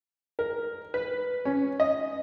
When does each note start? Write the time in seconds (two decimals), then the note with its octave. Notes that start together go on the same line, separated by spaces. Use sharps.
0.39 A#4
0.94 B4
1.45 C#4
1.80 D#5